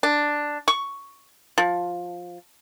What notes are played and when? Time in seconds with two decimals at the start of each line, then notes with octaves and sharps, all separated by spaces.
0.03 D4
0.68 C#6
1.58 F3